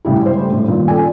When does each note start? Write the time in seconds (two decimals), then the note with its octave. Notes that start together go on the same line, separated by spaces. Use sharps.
0.05 A2 C#3 G3 E4
0.21 G#3 C5
0.39 G3 A3
0.52 A2
0.68 G2 A#2 D#3
0.88 C#4 F4 A4 D5 G#5